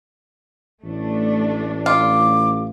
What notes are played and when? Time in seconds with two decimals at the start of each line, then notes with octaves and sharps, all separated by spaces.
0.83 A1 A3 D4
1.86 F4 D6